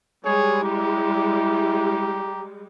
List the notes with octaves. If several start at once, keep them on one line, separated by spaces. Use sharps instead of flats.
G3 G#3 G#4 C#5
E4 G4 A#5